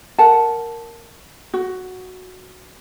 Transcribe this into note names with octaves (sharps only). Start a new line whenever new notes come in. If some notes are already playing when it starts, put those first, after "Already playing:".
A#4 F#5 A5
F#4